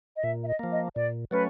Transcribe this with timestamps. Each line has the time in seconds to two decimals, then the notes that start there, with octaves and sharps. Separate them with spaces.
0.16 D#5
0.23 A#2 E5
0.43 E5
0.48 D#5
0.59 F3 A#3
0.72 D#5
0.96 A#2 D5
1.31 F#3 A3 C#4 B4